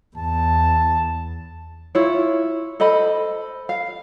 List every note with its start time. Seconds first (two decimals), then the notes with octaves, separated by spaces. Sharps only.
0.17 E2 A5
1.95 E4 F4 C#5
2.80 A4 C5 D#5 B5
3.69 F5